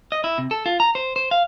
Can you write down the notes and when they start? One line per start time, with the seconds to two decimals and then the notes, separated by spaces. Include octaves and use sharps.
0.12 D#5
0.24 E4
0.38 C3
0.51 A4
0.66 F4
0.80 A#5
0.95 C5
1.16 C5
1.31 F5